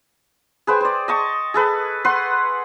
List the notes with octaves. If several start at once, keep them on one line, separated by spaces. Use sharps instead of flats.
G#4 B4 C5 G5
C5 D5
D#5 A5 C#6
G#4 A4 B4
B4 F#5 C6 C#6